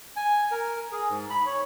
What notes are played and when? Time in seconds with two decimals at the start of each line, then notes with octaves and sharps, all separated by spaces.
0.16 G#5
0.51 A#4
0.92 G#4
1.10 G#2
1.30 B5
1.46 C#5